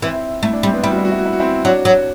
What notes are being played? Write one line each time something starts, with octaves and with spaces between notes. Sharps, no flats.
E3 C4 E4
A3 E4
D4
G3 C4
B3 D4
G3 E4
F#4
E4
F#4
E4
F#4
E4
F#4
C4 E4
F#3 D4 F#4
F#3